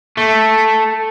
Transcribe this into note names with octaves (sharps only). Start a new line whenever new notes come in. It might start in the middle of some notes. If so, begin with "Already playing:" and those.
A3